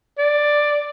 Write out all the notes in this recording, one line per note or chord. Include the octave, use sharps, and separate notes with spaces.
D5